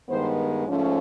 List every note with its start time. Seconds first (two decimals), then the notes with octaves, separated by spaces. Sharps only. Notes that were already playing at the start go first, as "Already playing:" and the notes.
0.09 G2 D#3 G#3 B3 C5
0.67 G#2 F3 A3 C#4